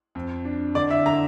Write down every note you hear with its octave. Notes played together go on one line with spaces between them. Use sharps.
F2
D4
D3 D5
E5
D3 A#5